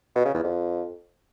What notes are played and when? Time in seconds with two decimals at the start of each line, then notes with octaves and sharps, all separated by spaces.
0.16 B2
0.25 C#3
0.34 E2
0.44 F2